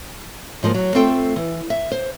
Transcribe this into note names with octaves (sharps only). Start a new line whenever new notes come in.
G#2 F3 G3 A#3
F#3
A3 C4 F4 A4 G5
E3
E5
C5